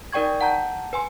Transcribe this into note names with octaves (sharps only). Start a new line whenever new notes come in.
D#4 A#4 D5 G5 C#6 G#6
F#5 A5 A#5 G6
B4 G#5 C6